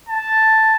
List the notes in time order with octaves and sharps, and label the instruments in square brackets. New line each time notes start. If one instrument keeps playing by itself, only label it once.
[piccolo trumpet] A5